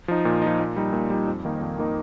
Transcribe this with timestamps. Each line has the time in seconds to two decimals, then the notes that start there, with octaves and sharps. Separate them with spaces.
0.08 F3 D#4
0.25 A#2
0.42 F3 D#4
0.60 A#2
0.76 G3 D#4
0.93 A#2
1.10 G3 D#4
1.27 F2
1.45 D#3 A#3 D#4
1.61 F2
1.79 D#3 A#3 D#4